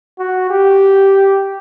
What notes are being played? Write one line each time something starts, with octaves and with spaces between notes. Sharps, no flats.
F#4
G4